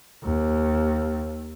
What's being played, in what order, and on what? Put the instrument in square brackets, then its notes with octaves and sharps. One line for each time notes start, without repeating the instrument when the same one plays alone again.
[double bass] D#2